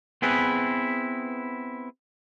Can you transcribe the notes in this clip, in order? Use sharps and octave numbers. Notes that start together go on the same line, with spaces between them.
B3 C4 E4 G#4 B4